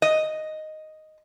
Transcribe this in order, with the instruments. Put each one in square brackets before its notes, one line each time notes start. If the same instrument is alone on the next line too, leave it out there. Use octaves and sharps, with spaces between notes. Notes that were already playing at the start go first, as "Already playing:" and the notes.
[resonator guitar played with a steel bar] D#5